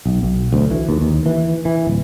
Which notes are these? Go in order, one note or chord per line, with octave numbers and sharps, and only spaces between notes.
B1
B1
D2
E3
D#2
D#2
E3
E3
D1